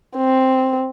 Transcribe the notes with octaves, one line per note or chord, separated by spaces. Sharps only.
C4